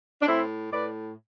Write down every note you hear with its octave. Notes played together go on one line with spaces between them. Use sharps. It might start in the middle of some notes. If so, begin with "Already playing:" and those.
D4
A2 C4 E4
A2 B4 D5